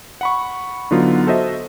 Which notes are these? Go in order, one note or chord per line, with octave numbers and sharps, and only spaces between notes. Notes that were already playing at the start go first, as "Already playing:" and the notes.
F#5 B5 C#6
D3 F#3 B3 D#4 F4
F#4 A4 C5 D#5 E5